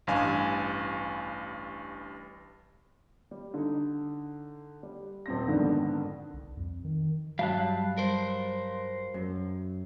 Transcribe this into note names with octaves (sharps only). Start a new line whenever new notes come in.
A1 G2 F5 G#5
G3
D3 D#4
G3
D#1 C4 A#6
F2 G#2 D3 D#3 B3 D4
C2
F2
D#3
G2 F#3 G3 F5 A5 F#6
A#4 C5
F#2